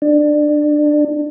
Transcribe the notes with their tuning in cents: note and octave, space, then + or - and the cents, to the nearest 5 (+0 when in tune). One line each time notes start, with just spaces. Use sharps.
D4 +20